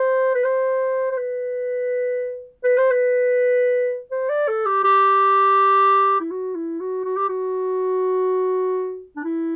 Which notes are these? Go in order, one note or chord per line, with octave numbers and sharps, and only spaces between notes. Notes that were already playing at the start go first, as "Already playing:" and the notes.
Already playing: C5
B4
C5
C5
B4
B4
C5
B4
C5
D5
A4
G4
G4
E4
F#4
E4
F#4
F#4
G4
F#4
D4
E4